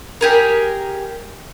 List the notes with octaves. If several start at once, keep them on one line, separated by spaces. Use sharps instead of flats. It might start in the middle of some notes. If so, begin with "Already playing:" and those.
G4 G#4 A#4